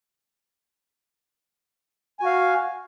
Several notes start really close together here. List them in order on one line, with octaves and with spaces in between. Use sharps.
G#5 F#4 F5